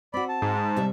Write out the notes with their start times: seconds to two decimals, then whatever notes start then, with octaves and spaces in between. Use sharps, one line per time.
0.14 C4 F#4 D5 B5
0.29 A5
0.42 G#2
0.77 C3 G3 E5